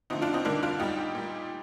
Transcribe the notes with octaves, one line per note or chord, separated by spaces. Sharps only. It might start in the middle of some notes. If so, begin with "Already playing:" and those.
D3 F3 A3 C4 D#4
D4 F4
C4 D#4
D3 G3 A#3 D4
D4 F4
A#2 G3 D#4 G4
A#2 G3